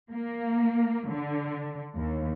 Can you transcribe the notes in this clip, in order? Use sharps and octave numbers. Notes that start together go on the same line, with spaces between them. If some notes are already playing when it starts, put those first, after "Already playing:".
A#3
D3
D#2